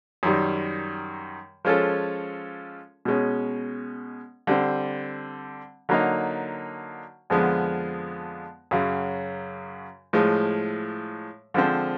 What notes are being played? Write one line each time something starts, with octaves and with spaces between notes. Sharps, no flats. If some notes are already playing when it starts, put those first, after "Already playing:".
F#2 D#3 G3
F3 G#3 C#4 F4 A4
B2 G#3 C#4
D3 G3 C4
D3 F#3 A#3 D#4
F2 D3 F3 G#3 B3
F#2 C#3 F#3
A2 F3 G#3
D3 F3 G#3 C4